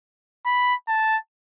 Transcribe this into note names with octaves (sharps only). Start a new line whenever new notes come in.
B5
A5